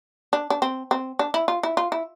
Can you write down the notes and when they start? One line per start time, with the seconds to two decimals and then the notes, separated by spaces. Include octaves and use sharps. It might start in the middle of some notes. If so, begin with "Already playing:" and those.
0.33 D4
0.50 D4
0.62 C4
0.91 C4
1.19 D4
1.34 E4
1.48 F4
1.63 E4
1.77 F4
1.92 E4